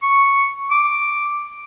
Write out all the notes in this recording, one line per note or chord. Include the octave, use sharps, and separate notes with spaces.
C#6
D6